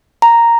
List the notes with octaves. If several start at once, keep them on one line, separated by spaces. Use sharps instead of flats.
A#5